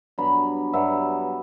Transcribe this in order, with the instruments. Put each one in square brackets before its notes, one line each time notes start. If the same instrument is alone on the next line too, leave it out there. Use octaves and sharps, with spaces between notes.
[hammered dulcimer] G2 F#3 B3 D4 B5
G2 F#3 B3 D4 E5